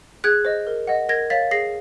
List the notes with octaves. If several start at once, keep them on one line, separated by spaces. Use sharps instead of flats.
G#4 F#6 G#6
C5 D#5
A#4
D#5 F#5
A#4 G#6 A#6
C#5 F5 A6 B6
G#4 A#6 C7